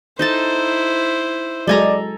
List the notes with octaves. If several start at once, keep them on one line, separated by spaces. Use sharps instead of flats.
D#4 E4 A4 C5 A5
F#3 G#3 A4 D5 G#5 A#5